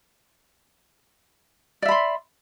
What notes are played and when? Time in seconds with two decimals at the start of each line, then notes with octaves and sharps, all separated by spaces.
1.82 D5
1.85 E5
1.88 B5
1.91 C6